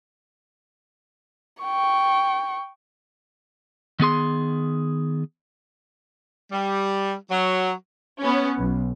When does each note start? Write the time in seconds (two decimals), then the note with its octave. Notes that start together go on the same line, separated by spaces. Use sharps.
1.63 G5 C#6
4.00 D#3 B3 G#4 C6
6.51 G3
7.30 F#3
8.22 B3 C#4
8.59 B1